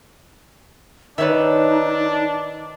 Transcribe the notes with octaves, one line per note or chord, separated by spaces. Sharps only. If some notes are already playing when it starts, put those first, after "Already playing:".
D#3 D4 D#4 B4 C#5 E5 A5